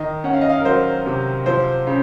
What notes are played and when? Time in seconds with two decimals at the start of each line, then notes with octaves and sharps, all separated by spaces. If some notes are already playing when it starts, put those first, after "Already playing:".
Already playing: D#3 D#5
0.24 C#4 F#5
0.33 F5
0.41 D#5
0.49 F5
0.60 A#4
0.65 F#3 C5
1.06 C3
1.46 F3 C5
1.87 C#3